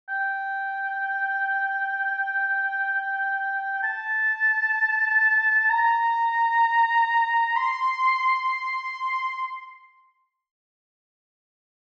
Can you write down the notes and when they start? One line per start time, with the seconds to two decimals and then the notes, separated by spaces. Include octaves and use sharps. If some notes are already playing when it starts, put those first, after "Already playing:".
0.09 G5
3.83 A5
5.70 A#5
7.56 C6